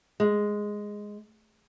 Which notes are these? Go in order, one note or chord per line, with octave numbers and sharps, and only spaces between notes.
G#3